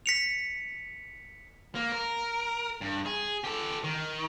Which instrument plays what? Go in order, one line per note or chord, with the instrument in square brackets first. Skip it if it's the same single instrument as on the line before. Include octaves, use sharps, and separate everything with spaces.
[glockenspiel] B6 C#7 F7
[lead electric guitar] A#3
A#4
G2
G#4
G4 A4
D#3